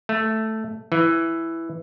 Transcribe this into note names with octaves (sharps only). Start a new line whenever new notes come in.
A3
E3